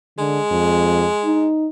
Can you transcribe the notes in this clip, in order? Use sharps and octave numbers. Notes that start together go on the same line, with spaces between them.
D3 G#3
F2
D#4